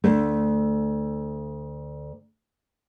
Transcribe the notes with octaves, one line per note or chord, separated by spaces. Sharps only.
D2 A3